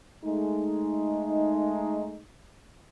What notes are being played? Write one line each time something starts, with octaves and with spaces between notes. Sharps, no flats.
G#3 A3 D#4